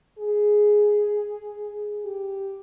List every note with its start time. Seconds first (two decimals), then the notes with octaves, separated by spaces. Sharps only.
0.18 G#4
2.05 G4